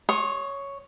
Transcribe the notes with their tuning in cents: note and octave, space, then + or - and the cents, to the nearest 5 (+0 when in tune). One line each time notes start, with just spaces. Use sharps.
C#5 +5 C6 +40 D#6 +15